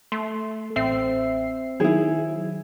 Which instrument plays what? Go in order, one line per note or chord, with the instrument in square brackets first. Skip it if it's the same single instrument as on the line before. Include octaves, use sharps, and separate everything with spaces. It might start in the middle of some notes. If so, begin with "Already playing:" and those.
[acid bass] A3 [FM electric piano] C6
[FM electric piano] A1 E5 C7 [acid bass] C4
[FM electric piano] D#3 F#3 [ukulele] E4 G#4